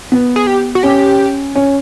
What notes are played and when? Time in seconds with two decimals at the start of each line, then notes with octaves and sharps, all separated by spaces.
0.12 B3
0.36 G#4
0.47 G4
0.75 F#4
0.83 C#4 G4
1.56 C#4